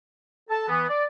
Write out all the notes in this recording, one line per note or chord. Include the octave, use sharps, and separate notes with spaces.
A4 A5
E3 B3
D5